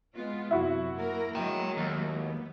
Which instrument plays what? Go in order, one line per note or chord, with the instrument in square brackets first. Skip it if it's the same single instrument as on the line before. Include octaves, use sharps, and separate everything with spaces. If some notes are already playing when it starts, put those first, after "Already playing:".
[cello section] G#3 B3 F4
[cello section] F#2 C3 [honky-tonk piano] E4 F#4
[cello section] A#3 A#4
[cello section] F#3 G#3 A#3 [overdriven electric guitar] G5 A#5
[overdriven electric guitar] D#2
[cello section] B3